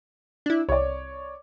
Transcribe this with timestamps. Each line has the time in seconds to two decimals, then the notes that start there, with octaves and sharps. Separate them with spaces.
0.46 D4 E4
0.69 C2 C#5 D5